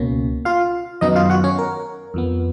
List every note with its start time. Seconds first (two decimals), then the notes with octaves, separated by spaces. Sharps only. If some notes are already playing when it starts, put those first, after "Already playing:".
Already playing: C#2 B2 A#3 C#4
0.45 F4 F5
1.01 F#2 D#3 F#3 B3 D#4 D#5
1.16 F4 F5
1.30 F#4 F#5
1.44 C#4 C#5
1.58 A#4
2.14 F2 F3 B3